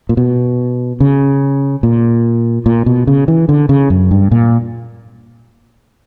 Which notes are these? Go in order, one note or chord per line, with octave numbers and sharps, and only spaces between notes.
A#2
B2
C#3
A#2
A#2
B2
C#3
E3
D3
C#3
F#2
G2
A#2